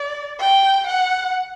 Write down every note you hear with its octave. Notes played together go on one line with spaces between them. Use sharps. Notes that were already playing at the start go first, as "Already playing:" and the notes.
Already playing: D5
G5
F#5